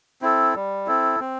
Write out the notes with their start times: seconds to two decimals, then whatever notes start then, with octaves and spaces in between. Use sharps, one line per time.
0.22 C4 E4 A4
0.55 G3
0.87 C4 E4 A4
1.20 C4